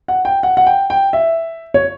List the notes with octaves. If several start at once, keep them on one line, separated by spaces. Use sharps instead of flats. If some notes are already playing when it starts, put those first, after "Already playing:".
F#5
G5
F#5
F#5
G5
G5
E5
C#5